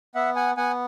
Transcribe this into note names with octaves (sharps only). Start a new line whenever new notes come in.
B3 E5 F#5
F#5 G#5
B3 F#5 G#5